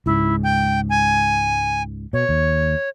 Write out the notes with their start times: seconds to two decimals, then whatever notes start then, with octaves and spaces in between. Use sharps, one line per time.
0.06 C#2 G#2 E4
0.43 G5
0.90 G#5
2.13 B2 C#5
2.29 D#2